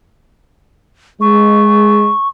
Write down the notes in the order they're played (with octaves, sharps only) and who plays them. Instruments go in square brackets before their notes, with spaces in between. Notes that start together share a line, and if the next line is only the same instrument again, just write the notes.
[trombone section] G#3 [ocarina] C#6